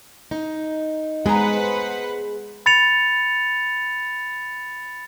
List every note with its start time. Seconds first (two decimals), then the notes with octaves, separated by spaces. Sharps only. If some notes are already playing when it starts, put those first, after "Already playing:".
0.31 D#4
1.26 G#3 B3 G#4 B4 C5 F#5 A#5
2.66 B5 A6 C#7 F7